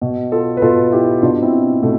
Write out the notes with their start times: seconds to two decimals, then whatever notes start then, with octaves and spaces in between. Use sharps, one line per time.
0.02 B2
0.32 F4 A4
0.57 B4
0.62 B2 F4 A4
0.92 E4 G4
1.22 B2 D4 F4
1.42 C4 E4
1.82 B2 A3